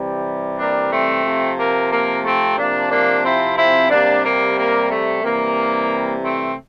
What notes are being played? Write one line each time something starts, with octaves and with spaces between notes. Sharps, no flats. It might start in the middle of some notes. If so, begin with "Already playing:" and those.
Already playing: C3 E3 G3
A#3 D4
A3 C4
C3 F3
A#3
A#3
A3 C4
C3 F3 A#3 D4
A#3 D4
C4 E4
C4 E4
C3 G3 A#3 D4
A#3
A#3
A3
C3 E3 G3 A#3
A3 C4